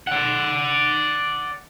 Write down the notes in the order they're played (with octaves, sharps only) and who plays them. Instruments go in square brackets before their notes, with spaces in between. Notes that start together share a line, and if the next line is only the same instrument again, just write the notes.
[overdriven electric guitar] D5 F#5